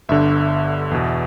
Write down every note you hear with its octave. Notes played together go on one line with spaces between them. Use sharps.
G1 G2 D3 E5
E2 B2